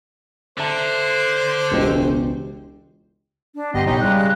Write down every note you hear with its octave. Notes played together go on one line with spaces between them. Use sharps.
D3 C5 E5 A5
E1 C#2 G4 D#5
D4
G1 B3 G4 D#5 C6
B1 A2 C#4 D#4 D#5
C#3 G3 G#3 G4 F#6
F#6